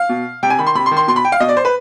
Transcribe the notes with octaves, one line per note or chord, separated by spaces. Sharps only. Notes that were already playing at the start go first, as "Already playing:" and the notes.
Already playing: F5
B2
C3 G5
G#5
D#3 B5
C6
C3 B5
C6
D#3
C6
B2 C6
B5
G5
F5
B2 D#5
D5
C5
B4